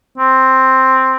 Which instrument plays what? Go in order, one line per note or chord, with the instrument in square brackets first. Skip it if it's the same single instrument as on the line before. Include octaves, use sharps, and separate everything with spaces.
[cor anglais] C4